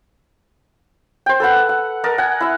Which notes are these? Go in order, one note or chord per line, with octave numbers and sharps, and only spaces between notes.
C5 G5
A4 B4 F#5
F#5
A#4 D#5 A5
F#5 G#5
E4 E5